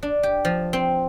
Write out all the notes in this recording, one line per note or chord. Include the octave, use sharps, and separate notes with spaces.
D4
G4
F3
C4